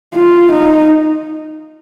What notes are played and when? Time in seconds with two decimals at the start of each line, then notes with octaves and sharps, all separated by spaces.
0.14 F4
0.51 D#4